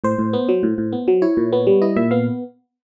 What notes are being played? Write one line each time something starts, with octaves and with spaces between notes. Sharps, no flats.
A2 C5
A2
B3
F#3
A2
A2
B3
F#3
E4 C#5
A#2
B3
G3
E4 D#5
A#2 E5
B3 F5